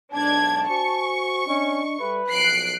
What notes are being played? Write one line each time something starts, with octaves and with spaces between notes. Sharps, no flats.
B1 G#2 D4 A5 G#6
F#4 C5 G#5 C#6
C#4 D4 D#5
G3 A4 B4 E5
B1 F3 F#6 C7 D7